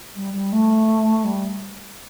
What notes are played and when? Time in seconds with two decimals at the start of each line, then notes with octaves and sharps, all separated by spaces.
0.16 G3
0.33 G3
0.52 A3
1.24 G3